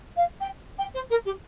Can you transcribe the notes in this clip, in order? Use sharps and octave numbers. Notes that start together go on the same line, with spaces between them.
F5
G5
G5
C5
A#4
G4